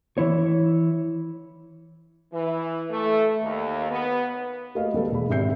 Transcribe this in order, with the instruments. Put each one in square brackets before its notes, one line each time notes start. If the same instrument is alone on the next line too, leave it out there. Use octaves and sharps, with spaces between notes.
[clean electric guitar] E3 E4 C#5
[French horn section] E3
A3
D#2
B3
[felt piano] A3 A#3 F#4 B4 D#5 F5
D#2 G3 A4 B4
E1 G#4 B5
G#1 G#2 G4 E5 G6 C7